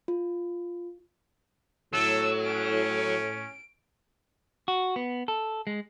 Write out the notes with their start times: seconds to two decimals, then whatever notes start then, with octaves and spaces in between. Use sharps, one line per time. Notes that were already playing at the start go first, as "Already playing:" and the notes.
0.08 F4
1.93 A2 F#3 A4 E6
2.45 C#4 D7
4.68 F#4
4.96 B3
5.28 A4
5.67 G#3